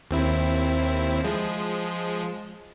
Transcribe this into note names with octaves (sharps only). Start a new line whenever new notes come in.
D#2 C4 E4
F3 G#3